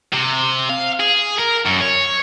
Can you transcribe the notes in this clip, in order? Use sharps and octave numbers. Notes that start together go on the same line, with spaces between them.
C3
F5
G#4
A#4
F#2
C#5